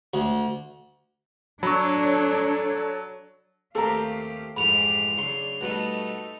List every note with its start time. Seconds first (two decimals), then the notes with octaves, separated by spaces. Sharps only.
0.14 D2
1.63 F#3 D4 A4 C#5 B5 C#6
3.75 D#2 A3 C4 G4 A4 F5 A#5
4.57 F2 G#2 E3 G#3 G4 B5 F7
5.17 C#3 F#3 D4 C6
5.61 B2 G3 A3 B3 D#4 A4